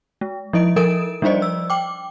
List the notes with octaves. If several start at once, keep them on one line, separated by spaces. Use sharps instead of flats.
G#3
F3 E4 D#5 D7
F3 A4 A#4 D#6 D7 E7
F3 G3 D4 C5 D5 D#5
E6
G5 D6